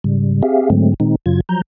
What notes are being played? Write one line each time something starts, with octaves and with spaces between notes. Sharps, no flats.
G#2 C#3 G3
C4 G4 G#4 E5 F5
G#2 D3 F#3 G#3 A3 C4
A#2 D#3 G#3 C4 D#4
F#2 C#3 F#3 F4 G#6
F3 F#3 A#5 G6